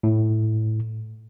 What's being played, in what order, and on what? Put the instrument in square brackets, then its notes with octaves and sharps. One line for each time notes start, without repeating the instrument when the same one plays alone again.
[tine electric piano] A2